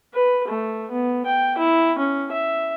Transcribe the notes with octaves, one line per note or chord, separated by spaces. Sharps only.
B4
A3
B3
G5
E4
C#4
E5